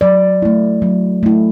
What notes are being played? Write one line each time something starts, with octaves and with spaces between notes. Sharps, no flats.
F#3 D5
A3 E4
F#3
A3 E4